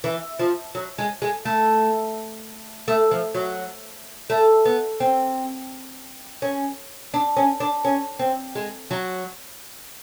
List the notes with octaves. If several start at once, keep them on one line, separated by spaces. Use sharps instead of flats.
E3
F3
F#3
G#3
G#3
A3
A3
F3
F#3
A3
B3
C4
C#4
D4
C#4
D4
C#4
C4
G#3
F#3